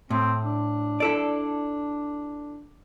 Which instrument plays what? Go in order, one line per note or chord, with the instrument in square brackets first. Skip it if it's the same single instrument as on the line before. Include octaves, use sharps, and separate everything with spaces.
[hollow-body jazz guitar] A2 [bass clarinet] C4
[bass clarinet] D4
[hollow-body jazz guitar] E4 A4 D5